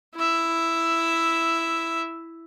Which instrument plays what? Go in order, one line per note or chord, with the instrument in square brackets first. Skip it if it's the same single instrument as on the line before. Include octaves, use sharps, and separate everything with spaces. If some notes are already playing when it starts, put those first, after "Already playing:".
[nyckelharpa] E4 E5